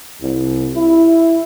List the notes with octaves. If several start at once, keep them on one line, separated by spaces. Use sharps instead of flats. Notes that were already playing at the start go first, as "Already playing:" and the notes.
C2
E4